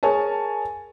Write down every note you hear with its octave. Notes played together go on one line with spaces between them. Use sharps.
G#4 A#4 C#5 G#5 A5